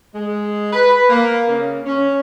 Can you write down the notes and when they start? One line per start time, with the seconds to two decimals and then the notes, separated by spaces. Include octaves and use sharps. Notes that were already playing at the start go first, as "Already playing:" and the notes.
0.13 G#3
0.72 B4
1.09 A#3
1.49 C#3
1.85 C#4